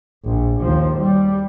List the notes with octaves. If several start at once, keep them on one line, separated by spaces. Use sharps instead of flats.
A#1
D#2 F3
G3